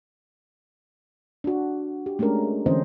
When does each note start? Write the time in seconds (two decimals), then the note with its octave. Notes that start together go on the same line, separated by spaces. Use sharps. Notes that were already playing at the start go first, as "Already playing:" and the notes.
1.44 D4 F#4
2.06 G4
2.19 G#3 A3 C#4 D4 A#4
2.66 D3 E3 C4 C#4 C5 D#5